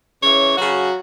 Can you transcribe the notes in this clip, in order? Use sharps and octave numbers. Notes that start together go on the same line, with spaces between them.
C#3 E3 C#5
C#3 F#3 F#4